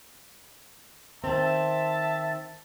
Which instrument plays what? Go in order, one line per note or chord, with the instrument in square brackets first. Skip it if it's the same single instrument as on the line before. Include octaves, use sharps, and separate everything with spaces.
[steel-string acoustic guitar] D#3 C4 [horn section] E5 A5